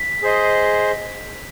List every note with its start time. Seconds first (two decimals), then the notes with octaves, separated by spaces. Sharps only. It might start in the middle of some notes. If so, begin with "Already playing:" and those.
Already playing: B6
0.22 G#4 C5 D#5